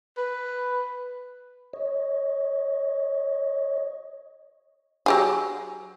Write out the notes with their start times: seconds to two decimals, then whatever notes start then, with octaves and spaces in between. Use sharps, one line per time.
0.17 B4
1.73 C#5 D#5
5.06 F#3 G4 G#4